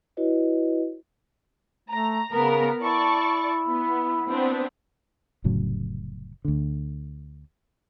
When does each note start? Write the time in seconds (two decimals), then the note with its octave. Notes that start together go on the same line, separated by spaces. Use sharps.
0.17 E4 F#4 B4 C#5 D#5
1.89 A3 A#5
2.32 C#3 B3 A#4 A#5
2.81 E4 D5 A5 C#6
3.68 B3
4.29 B3 C4 D4
5.44 F1 A2 C#3 F#3
6.45 D2 D3